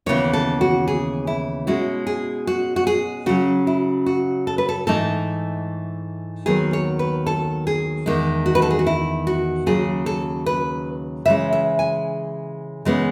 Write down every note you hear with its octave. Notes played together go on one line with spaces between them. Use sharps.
D#2 C#3 E3 B3 C#5
A4
F#4
G#4
E4
B2 G#3 C#4 E4 F#4
G#4
F#4
F#4
G#4
C#3 F#3 C#4 F#4
E4
F#4
A4
B4
A4
G#2 E3 A3 D#4 A4
D#2 D#3 F#3 B3 G#4
C#5
B4
A4
G#4
E2 D#3 G#3
F#4
B4
A4
G#4
F#4
E4
F#4
D#2 C#3 F#3 G#4
A4
B4
C#3 E3 G#3 E5
E5
G#5
C#3 E3 G#3 B3